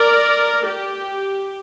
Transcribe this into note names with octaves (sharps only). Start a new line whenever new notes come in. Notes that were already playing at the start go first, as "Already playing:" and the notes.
Already playing: A#4 D5
G4